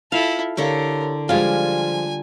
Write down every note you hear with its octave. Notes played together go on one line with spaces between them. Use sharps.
E4 F4 A4 F5
D3 E4 G4 A#4 C#5 F5 C#6
F3 G3 G#3 F4 F5 G#5